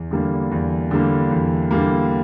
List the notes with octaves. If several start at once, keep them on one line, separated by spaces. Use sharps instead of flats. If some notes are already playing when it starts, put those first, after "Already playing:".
Already playing: E2
D3 G3 A#3
E2
D3 G3 A#3
E2
D3 G3 A#3